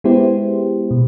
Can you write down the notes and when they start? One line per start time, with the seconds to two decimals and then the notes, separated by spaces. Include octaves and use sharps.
0.04 G#3 B3 E4 G4 C5
0.91 B2